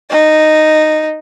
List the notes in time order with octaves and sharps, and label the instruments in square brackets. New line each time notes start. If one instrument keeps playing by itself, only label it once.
[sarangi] D#4